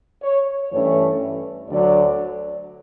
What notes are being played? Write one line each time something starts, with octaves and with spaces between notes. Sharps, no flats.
C#5
G2 E3 A3 C#4 C#5
D2 D3 F#3 D5